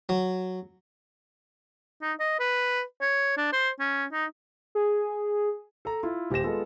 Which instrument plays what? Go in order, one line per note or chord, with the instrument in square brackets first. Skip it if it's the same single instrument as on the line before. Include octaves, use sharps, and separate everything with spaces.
[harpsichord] F#3
[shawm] D#4
D#5
B4
C#5
D4
C5
C#4
D#4
[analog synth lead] G#4
[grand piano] A4 A5 A#5
E4 F4
D#1 G4 C5 A#6 E7
G#3 B3 F4 A4